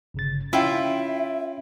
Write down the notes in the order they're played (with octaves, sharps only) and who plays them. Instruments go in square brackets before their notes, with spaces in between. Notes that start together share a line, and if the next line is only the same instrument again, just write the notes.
[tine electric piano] G1 C#3 A6
[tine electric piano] C#4 [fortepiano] E4 [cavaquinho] F4 G5 [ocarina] E5